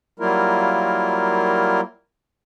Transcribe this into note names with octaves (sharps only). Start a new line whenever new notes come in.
F#3 G3 A#3 E4 F4 A#4